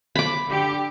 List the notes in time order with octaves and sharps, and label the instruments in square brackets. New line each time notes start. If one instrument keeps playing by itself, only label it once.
[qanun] B5 D6
[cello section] D3 G4